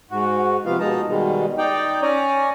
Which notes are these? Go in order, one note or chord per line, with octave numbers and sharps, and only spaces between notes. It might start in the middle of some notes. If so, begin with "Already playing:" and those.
G#2 F#4
C3 F3 B3 F4 F5
B2 G#3 A#3 D#4 A5 A#5
B2 D#3 G3 G#3
D#4 D5 G5
C#4 C#5 D5 G#5 A#5